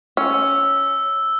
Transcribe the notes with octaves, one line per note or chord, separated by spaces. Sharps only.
C#4 E6